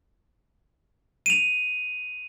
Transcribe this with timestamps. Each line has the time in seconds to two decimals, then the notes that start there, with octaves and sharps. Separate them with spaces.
1.26 D#7 F7